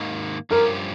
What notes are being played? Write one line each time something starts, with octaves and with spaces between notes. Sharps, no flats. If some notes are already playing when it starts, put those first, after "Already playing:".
Already playing: G#2 D#3 A#3
G2 F3 C#4 G4 A#4